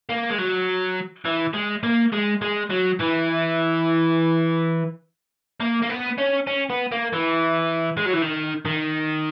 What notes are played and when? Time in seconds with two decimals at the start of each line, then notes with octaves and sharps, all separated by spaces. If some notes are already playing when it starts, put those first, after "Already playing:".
0.09 A#3
0.30 G#3
0.38 F#3
1.25 E3
1.54 G#3
1.83 A#3
2.12 G#3
2.42 G#3
2.70 F#3
3.00 E3
5.60 A#3
5.82 A#3
5.90 B3
6.18 C#4
6.47 C#4
6.70 B3
6.92 A#3
7.13 E3
7.97 G#3
8.06 F#3
8.13 E3
8.22 D#3
8.65 D#3